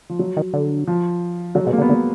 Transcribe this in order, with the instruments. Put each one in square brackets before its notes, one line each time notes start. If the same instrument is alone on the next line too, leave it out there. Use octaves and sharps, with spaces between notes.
[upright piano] F3
F#3
[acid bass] D#3
D3
[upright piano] F3
[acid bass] D3 [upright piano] F#3
[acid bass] B2 [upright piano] G#3
[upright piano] A#3
[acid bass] D3
[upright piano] B3
[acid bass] D3 [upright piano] A#3